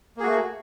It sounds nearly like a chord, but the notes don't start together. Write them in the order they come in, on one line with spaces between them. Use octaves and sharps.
A#3 G#4 F#4 A3